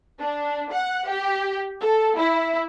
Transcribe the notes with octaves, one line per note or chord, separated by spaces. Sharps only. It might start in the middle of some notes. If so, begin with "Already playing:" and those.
D4
F#5
G4
A4
E4